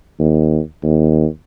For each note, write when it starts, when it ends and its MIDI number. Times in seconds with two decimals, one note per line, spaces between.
0.19 0.59 39
0.83 1.26 39